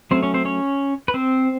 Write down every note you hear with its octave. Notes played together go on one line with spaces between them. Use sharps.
F#3 A3 C4 C#4 C5
C#4 C#5
C4 C5
C#4 C#5
B4
C4 C5